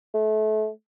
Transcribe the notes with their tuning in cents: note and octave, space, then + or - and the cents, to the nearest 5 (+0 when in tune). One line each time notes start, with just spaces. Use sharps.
A3 -30